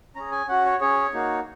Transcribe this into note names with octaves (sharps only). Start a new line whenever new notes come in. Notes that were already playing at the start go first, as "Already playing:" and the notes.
C#4 G#4 A#5
G#5
C#4 F#4 F#5
C#5
C#4 G#4 C#5
A#3 D#4 F#4